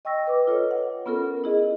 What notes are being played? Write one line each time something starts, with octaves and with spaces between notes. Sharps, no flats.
D#5 G5 C#6 E6 A#6
B4 D6
F4 A4 C#5 D#5
F#5
B3 C#4 F4 A4 A#4
E4 G#4 D#5